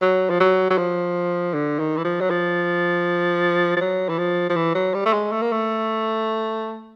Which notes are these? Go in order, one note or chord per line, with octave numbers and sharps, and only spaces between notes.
F#3
F3
F#3
F#3
F3
D3
D#3
E3
F3
F#3
F3
F3
F#3
E3
F3
F3
E3
F#3
G3
A3
G#3
A3
A#3
A3